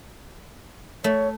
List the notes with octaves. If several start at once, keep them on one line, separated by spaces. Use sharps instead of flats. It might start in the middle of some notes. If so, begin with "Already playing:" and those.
A3 C#5